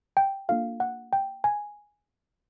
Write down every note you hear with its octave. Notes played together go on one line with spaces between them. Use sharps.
G5
A#3 D4 F4 A4 F5
F#5
G5
G#5